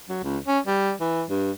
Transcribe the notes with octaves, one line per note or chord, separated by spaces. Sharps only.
F#3
C#2
C#4
G3
E3
G2